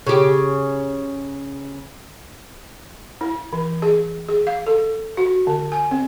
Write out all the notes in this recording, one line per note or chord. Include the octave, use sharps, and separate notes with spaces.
C#3 G4
E4
E3
G#4
G#4
F5
A4
F#4
D3
G#5
C4